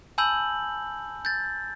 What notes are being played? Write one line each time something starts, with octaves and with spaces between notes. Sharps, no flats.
G#5 A5 B5 E6 G6 F#7
G6 A6